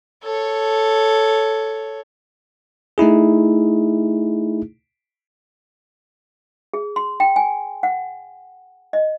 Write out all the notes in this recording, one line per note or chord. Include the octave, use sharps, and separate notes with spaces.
A4 C#5
A3 D#4 E4 G#4
G#4
C6
G5
G#5
F#5
D#5